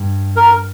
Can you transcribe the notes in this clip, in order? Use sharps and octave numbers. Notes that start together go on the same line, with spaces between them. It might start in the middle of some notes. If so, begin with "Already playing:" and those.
Already playing: G2
A#4